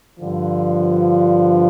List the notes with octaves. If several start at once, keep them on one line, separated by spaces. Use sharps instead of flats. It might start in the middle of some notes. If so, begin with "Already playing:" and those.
G2 D3 F3